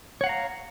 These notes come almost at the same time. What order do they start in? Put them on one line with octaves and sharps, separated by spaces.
C#5 F#5 F5 A#5